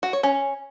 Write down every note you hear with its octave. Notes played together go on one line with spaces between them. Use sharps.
F#4
C#5
C#4